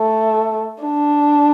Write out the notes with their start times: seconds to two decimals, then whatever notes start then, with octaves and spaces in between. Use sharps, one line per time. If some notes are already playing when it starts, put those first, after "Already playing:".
Already playing: A3
0.84 D4